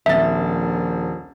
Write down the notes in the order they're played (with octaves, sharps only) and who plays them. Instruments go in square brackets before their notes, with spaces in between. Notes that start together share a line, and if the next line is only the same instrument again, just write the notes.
[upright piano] D#1 C4 A6 [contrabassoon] A#1 [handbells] E5